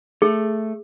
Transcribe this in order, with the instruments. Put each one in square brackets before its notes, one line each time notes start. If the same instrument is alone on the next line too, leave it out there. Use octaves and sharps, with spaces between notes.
[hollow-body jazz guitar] A3 [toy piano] G#4